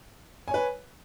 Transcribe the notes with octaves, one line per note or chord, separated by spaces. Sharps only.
B4 C#5 G#5